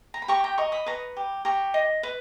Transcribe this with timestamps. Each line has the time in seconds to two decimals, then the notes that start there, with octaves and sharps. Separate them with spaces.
0.14 A#5
0.22 B5
0.28 G4 A#5 C#6
0.44 G5 A#5
0.58 D#5 A#5 C#6
0.72 B5 D#6
0.86 B4 A#5 C#6
1.17 G4
1.45 G4 A#5 C#6
1.74 D#5
2.03 B4